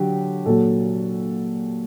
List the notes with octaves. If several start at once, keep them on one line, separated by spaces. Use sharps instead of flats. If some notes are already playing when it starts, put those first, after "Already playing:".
Already playing: D3 F#3 G4
A#2 F#3 A4